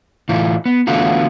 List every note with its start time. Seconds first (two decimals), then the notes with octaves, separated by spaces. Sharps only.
0.29 A2 E3 F4
0.66 B3
0.87 D3 E3 A3 B3 F4 F#4